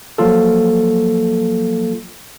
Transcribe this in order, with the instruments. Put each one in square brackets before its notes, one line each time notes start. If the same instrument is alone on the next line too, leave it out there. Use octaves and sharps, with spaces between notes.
[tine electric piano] F3 F#3 A#3 F4 A4